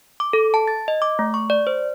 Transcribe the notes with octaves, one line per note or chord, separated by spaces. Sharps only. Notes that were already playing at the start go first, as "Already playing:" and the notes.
D6
A4
A5
A6
D#5
D6
A3
C#6
D5
C5